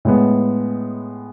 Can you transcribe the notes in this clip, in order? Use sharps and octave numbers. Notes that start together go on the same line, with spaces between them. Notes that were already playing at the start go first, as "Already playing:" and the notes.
A2 G#3 B3